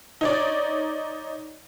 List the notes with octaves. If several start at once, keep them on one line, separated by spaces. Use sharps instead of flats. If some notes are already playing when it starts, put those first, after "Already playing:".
D#4 C#5 D5